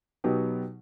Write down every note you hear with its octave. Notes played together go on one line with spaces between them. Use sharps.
B2 F#3 B3 D#4 G4